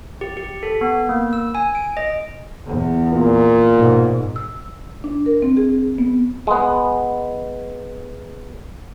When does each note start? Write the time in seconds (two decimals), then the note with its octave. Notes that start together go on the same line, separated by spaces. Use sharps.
0.21 G4
0.37 G4
0.63 A4
0.81 B3
1.09 A#3
1.33 E6
1.55 G#5
1.75 D7
1.97 D#5
2.66 E2
3.11 A#2
3.71 G#2 B2
4.36 E6
5.04 D4
5.26 A#4
5.42 C4
5.57 G#4
5.98 B3
6.47 G#3 B3